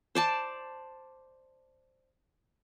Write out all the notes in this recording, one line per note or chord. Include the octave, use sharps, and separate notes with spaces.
C5 D5 A5